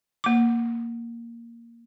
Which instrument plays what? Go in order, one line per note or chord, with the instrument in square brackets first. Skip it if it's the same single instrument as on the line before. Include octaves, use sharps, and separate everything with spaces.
[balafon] A#3 D6